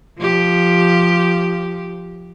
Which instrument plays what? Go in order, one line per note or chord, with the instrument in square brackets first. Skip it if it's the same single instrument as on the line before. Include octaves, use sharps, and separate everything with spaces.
[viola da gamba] F3 G4